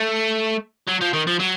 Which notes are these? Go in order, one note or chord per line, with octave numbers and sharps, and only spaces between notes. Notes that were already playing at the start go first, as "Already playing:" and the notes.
Already playing: A3
F#3
F3
D#3
F3
F#3